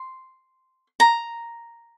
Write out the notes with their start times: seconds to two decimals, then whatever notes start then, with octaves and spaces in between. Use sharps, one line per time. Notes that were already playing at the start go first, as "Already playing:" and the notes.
Already playing: C6
1.00 A#5